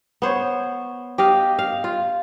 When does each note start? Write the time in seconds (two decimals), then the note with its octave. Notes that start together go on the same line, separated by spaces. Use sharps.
0.22 B3 C5 C#5
1.18 G4 D#5 F5
1.59 F5
1.84 F4